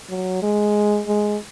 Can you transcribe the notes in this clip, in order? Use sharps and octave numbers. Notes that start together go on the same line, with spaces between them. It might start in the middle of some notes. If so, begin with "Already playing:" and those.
F#3
G#3
G#3